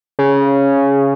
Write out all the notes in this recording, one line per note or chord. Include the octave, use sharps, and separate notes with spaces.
C#3